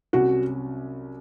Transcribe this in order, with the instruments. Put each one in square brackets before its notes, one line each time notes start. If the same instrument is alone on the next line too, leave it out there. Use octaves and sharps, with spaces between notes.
[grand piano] C2 C3 F#3 C#4 [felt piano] F#4